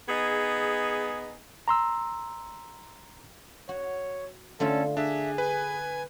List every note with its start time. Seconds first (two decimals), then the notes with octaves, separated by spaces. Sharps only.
0.09 B3 D#4 G#4
1.68 A#5 C6 E6
3.69 F#4 C#5
4.60 D3 A3 C#4 F4 A4
4.97 D4 G#4 E5
5.38 B4 G#5